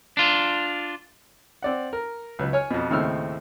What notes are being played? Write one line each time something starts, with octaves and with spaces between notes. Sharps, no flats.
D4 F4
C4 D5 F#5
A#4
C#2 F#3 B4
C#5 G#5 F6
F2 B2
D#2 A2 C#3 C4 E6 F6